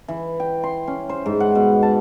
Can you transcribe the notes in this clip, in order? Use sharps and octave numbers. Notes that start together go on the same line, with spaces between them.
E3
G5
C6
C#4
C5
G#2
F#5
B2
A5